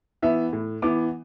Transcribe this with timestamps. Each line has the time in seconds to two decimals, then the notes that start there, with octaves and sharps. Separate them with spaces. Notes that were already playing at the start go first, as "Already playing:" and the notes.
0.22 E3 B3 E5
0.53 A2
0.82 E3 B3 D6